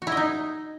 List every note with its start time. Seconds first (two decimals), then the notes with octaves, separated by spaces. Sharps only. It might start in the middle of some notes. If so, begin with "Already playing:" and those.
0.02 F#4
0.07 E4
0.12 D#5
0.17 D#4